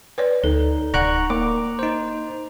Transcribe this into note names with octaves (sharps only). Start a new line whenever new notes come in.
B4 C#5 D5
D2 D#4 A4
D1 D5 F#5 A#5 C#6 F#6
A#3 A#5 D6
D#4 C5